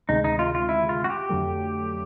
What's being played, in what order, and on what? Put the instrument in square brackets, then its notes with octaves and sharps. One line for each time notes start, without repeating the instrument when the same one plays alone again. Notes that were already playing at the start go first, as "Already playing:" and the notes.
[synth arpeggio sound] D2 C3 D#3 G#3 [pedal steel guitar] D#4
[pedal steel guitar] D#4
F4
F4
E4
F4
F#4
G4
[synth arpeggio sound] F2 D3 F#3 A3